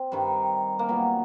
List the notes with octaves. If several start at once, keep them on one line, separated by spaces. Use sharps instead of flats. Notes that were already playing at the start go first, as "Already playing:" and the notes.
Already playing: C4
G2 D#3 G3
A#3
A#2 F#3 B3